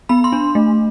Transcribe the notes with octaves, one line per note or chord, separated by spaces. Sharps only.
B3 B5
C6
D4
A3